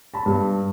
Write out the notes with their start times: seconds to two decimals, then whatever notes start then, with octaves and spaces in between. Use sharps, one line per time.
0.14 A5 B5
0.26 G2